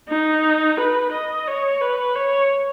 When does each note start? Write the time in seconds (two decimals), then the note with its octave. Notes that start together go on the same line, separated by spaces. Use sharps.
0.09 D#4
0.78 B4
1.12 D#5
1.47 C#5
1.81 B4
2.15 C#5